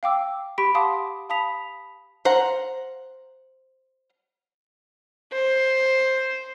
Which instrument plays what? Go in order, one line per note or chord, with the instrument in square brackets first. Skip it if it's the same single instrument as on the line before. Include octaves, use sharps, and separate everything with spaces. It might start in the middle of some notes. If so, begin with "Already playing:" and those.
[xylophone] F5 G5 D6 E6
G4 B5 C#6 B6 D7
F5 F#5 A5 C6 D6 D#6
F5 A5 B5 D#6 B6 F7
[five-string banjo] C5 F5 F#5 A#5
[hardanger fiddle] C5